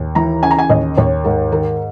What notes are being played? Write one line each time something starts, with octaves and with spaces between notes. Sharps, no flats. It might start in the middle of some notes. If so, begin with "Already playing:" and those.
Already playing: D#2
E3 A#5
C#3 G#5
A#5
G#5
D#2 D#5
D#2 C#5
G#2 A#4
D#3 A#4